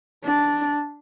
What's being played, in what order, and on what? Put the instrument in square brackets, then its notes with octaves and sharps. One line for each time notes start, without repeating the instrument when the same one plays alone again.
[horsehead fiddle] D4